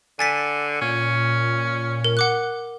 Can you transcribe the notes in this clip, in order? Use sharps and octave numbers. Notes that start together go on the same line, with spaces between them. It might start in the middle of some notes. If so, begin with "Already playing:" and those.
D3 G#5 A6 B6
A#2 C#4
A#4
F#5 D6 F#6